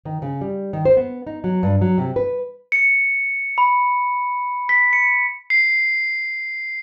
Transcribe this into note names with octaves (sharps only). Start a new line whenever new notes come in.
D#3
C#3
G3
D#3
C5
B3
D#4
F#3
G2
F#3
C3
B4
C#7
B5
B6
C#7
C7